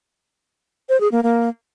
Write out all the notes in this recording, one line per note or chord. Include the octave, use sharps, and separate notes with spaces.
C5
G#4
A#3
A#3